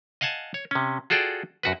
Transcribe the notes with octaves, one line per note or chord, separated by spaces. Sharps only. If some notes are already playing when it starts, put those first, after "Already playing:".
D#5 F5 F#5 G#5 A5
C#5
C3 C#4
F4 F#4 G#4 A4 D5 G5
F#2 F#4 B4